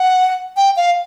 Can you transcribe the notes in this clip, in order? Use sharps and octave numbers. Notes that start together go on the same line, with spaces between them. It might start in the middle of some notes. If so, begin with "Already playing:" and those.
Already playing: F#5
G5
F5